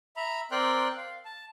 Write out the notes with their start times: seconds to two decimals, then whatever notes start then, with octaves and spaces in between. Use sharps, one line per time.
0.17 E5 A#5 B5
0.51 C4 A#4 D5 G5 C6 F#6
0.97 F5
1.25 A5